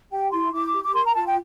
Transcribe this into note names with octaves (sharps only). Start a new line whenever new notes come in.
G4 G5
E4 C6
E4 D6
G4
D6
A#4 C6
A#5
F4 A5
G5